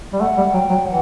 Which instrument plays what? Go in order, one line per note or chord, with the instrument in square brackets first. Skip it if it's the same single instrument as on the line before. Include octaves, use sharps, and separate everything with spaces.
[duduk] G3
[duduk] A3 [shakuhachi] F#5
[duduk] G3
[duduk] F#3 [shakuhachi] G5
[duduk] F#3
[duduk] E3 [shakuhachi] F#5